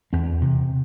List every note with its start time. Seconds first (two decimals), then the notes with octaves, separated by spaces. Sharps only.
0.13 E2 C4
0.41 C3